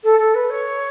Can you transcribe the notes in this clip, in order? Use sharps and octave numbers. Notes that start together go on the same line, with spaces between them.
A4
A4
B4
C#5